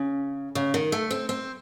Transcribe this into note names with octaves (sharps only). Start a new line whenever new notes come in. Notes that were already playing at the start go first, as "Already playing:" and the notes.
Already playing: C#3
C#3
D#3
A3
C4
C4